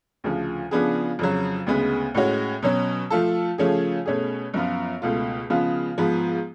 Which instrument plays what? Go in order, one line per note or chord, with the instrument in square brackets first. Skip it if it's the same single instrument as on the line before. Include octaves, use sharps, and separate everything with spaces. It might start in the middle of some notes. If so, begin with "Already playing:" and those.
[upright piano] D2 C#3 F3
C#3 F3 B3 D4 G#4
F2 C#3 F#3
D2 C#3 G#3 B3
A2 G#3 C#4 F#4
B2 F#3 C#4
F3 A3 F4 A4
C#3 F3 A3 C#4 G#4
B2 A3 C#4 G#4
F#2 F3 B3 F4
C#2 B2 A3 F4
C#3 F3 G#3 B3 F4
G#2 F3 B3